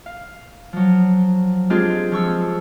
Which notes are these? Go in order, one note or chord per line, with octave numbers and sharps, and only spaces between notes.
F5
F3 F#3
G#3 C4 D4 F4 G4 G#4
F3 C#6 E6